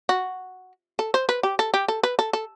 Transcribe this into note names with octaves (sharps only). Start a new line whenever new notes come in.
F#4
A4
C5
B4
G4
A4
G4
A4
B4
A4
A4